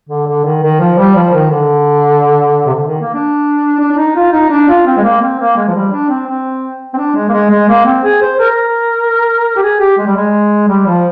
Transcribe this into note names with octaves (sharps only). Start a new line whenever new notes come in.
D3
D3
D#3
D#3
F3
G3
F3
D#3
D3
C3
D3
D#3
A#3
D4
D4
D4
D#4
F4
D#4
D4
F4
C4
G#3
A#3
C4
A#3
G#3
F3
G3
D4
C4
C4
C4
D4
G#3
A#3
G#3
G#3
A#3
C4
G#4
C5
A#4
G4
G#4
G4
G#3
G3
G#3
G3
F3